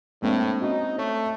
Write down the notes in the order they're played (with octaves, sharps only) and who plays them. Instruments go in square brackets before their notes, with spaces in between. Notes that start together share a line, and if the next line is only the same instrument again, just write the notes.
[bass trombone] A2 [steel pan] G#3 A#3 D4 [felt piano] C4
[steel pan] C#4 F#4 [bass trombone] D#4
[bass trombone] A3 [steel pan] C#5